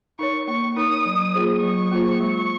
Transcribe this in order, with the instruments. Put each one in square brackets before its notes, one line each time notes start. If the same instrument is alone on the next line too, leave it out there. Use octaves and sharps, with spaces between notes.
[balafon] D#4 A#4 C#5 [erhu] C#6
[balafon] A#3 [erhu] C#6
[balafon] D#4 A#4 C#5 [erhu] D#6
[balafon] F#3
A#3 F4 G#4 C5
[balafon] F#3 [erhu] C#6
[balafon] A#3 F4 G#4 C5
G#3